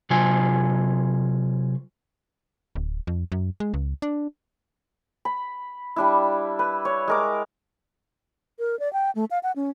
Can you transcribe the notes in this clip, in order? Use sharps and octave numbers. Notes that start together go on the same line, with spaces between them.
C3 F#3 F4 G#5
D1
F2
F#2
G#3
C#2
D4
B5
G3 D4 E4
B4
C#5
G#3 A#4 D6
A#4
D5
G5
A3
F5
F#5
C#4